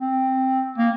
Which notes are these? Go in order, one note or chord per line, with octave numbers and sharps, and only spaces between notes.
C4
A#3